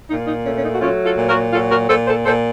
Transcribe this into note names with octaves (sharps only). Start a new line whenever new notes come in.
A#2 D#4
D#4
A3 C#4
C#4
D#4
F#4
F#3 C#4 F4
F4 A4
A#2
F#4 A#4
F#3 F4 A4
F#4 A#4
A#2 A4 C5
A4 C5
A#2 A4 C5